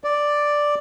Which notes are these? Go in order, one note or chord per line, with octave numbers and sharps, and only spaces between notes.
D5